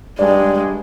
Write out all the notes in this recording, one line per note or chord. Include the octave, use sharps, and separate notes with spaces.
G2 G#3 D5